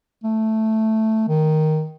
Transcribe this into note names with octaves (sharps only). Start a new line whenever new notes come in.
A3
D#3